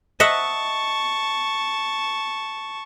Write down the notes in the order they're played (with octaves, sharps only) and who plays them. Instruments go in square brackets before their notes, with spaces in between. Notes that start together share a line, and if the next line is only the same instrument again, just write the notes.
[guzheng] D#5 E5 F#5 [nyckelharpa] A5 C#6